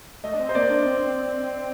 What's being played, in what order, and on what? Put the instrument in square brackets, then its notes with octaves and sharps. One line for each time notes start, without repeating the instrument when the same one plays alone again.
[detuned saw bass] A3 [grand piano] D#5
[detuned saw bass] D4
C4
[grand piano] C5
[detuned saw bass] A#3 [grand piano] D5
[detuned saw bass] D4
C4